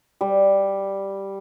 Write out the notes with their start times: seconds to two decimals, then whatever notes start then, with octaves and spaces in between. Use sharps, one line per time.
0.21 G3